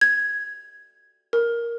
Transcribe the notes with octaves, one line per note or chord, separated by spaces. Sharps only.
G#6
A#4